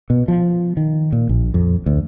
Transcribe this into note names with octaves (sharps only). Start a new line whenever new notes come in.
B2
F3
D#3
A#2
A#1
F2
D2